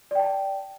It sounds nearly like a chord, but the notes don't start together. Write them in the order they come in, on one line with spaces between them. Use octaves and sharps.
D5 G5 A5